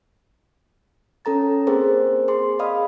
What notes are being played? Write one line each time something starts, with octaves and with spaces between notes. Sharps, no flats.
C#4 A4 A#5 A6
A#3 C4 G4 G#4 A#4 C5
G#4 C6
G#4 D5 D#5 F5 B5 D#6